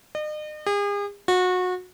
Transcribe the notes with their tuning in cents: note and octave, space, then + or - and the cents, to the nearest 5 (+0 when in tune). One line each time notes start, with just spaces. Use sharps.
D#5 -40
G#4 -40
F#4 -25